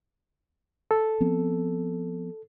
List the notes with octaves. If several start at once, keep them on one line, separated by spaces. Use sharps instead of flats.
A4
F3 B3 C4